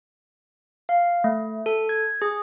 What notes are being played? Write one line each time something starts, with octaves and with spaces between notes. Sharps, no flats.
F5
A3
A4
G#6
G#4